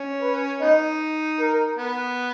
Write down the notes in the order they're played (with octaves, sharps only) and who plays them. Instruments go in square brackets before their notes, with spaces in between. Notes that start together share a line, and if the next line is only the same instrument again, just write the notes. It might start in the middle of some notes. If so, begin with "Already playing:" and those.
Already playing: [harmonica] C#4
[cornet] B4
[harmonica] B3 D#4 [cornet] D#5
[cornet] A#4
[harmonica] B3